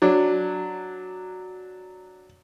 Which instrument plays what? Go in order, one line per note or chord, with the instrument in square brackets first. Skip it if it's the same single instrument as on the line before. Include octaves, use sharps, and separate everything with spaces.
[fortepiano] F#3 D4